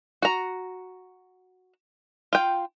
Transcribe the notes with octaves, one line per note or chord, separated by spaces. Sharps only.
F#4 A#5
F4 G5